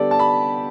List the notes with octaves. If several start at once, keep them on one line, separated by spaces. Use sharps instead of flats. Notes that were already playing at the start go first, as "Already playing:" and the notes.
Already playing: D3 G3 B3 G4 A4 D5
A5
B5